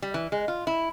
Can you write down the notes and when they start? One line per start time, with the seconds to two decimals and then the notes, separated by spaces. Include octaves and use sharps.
0.02 G3
0.14 E3
0.32 G#3
0.48 F4
0.67 E4